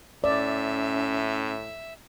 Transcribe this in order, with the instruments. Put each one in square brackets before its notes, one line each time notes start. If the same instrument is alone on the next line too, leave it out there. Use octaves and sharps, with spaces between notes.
[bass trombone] A2 [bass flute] C#4 [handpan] D5 [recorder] E5